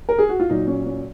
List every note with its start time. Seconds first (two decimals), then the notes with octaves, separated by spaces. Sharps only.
0.09 A#4
0.19 G#4
0.29 F#4
0.40 F4
0.50 A#2 F#3 D#4
0.67 C#4
0.86 C#4